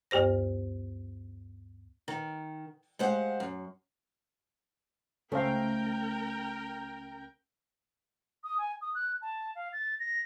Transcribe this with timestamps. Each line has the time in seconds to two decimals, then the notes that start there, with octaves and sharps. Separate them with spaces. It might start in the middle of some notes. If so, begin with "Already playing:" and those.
0.11 D2 G2 G4 C5 A#6
2.08 D#3
2.99 G#3 G4 C5 F5 F#5
3.40 F#2
5.32 C#2 A3 C#4 A4 A#4 C5 F5 G5
8.44 D#6
8.58 G#5
8.81 D#6
8.95 F#6
9.22 A5
9.55 F5
9.73 A6
10.00 A#6